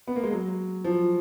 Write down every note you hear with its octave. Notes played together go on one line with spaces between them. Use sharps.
B3
A#3
G#3
F#3
F3